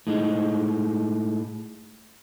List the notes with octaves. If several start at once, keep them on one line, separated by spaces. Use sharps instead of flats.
A2 G#3 D#4